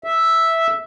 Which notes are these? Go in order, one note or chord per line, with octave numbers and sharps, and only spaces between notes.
E5